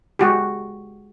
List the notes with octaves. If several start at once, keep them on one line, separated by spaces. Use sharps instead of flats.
G#3 F#4 G4